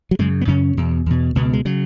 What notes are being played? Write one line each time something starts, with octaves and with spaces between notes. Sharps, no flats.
F#3
F#2 C#3 G#3
B3
F#2 C#3 C#4
E2 B2
E2 B2
C#2 B2 B3
G#3
C#3 F#3